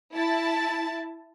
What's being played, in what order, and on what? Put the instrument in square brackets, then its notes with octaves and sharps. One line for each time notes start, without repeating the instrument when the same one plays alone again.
[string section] E4 A5